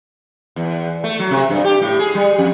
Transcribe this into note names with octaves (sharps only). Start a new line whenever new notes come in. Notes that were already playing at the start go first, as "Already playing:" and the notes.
E2
A3
F#3
C3
G2
G4
A2
G#4
G3
F2